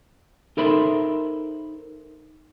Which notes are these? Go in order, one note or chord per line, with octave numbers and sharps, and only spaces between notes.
D#4 A4 A#4 C5 E5 B5